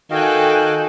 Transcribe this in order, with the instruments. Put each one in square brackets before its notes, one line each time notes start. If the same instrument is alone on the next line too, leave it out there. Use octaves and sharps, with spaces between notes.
[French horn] D#3 [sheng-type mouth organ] F#4 D#5 F5 [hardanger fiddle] A4 [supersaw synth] G5 G#5 F#6